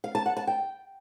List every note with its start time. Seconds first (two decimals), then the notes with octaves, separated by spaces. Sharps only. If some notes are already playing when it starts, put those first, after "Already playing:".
0.04 F5
0.15 A5
0.26 F#5
0.37 A5
0.47 G5